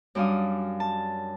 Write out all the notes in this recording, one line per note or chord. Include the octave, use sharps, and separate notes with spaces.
F#2 G3 D4 F5 D#6
A5